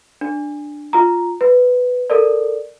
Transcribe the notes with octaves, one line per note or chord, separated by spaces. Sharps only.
D4
F4 A#5
B4
A4 A#4 D5